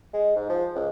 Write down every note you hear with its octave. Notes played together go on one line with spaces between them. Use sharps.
G#3
G#2
F3
C#2